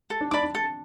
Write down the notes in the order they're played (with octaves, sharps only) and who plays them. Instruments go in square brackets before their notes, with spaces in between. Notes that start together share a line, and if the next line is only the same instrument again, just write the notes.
[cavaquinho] A4
[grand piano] D4
[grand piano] D4 [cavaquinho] D5 B5 D6
[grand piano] D4
[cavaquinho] A4